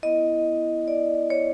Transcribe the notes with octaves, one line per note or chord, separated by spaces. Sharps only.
B3 E4 D#5
D5
C#5